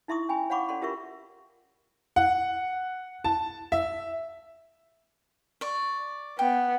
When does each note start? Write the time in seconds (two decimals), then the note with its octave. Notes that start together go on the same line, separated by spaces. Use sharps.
0.08 D#4 E4 E5 C6 C#6 D#6
0.29 C#4 G5 G#5 B5
0.50 C#5 F5 F#5 B5 C#6 D6
0.69 C#4 A4 D5 F#5 C6
0.81 C#4 F4 G4 A#4 E5 C#6
2.16 F#5
3.24 A5
3.72 E5
5.61 D5 C#6
6.39 B3 G5